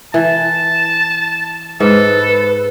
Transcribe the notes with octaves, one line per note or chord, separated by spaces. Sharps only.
E3 A5
G#2 A4 B4